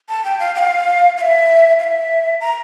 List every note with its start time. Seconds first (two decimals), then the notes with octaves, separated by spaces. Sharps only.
0.09 A5
0.25 G5
0.40 F5
0.55 G5
0.59 F5
1.17 F5
1.21 E5
1.79 F5
1.84 E5
2.41 A#5